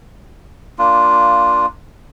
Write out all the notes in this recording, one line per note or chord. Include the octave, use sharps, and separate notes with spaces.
A#3 D4 F4